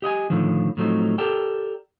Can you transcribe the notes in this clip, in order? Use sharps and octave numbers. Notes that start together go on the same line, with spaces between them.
G4 D#5 F#5 G#5
A2 D3 D#3 F3
A2 F3 F#3 A3 C4 D#4
G4 A4 A#4 D5 G5